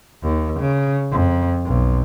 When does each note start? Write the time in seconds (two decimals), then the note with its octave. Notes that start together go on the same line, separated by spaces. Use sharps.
0.23 D#2
0.59 C#3
1.12 F2
1.65 B1